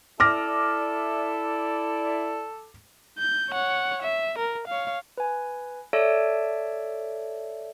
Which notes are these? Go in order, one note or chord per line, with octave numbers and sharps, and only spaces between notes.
E4 A4 D5 D6 F6 A#6
G6
C#5 F#5
E5
A#4
C#5 F5
B4 G#5
A4 C#5 D5 E5 A5 D7